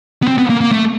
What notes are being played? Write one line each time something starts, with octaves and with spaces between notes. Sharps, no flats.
B3
C4
B3
A#3
A#3
A3